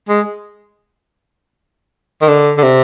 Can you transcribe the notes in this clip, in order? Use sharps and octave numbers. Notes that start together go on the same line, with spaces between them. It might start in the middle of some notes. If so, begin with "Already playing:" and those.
G#3
D#3
D3
D3
C3